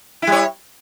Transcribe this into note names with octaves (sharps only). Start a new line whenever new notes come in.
G3 E4 C#5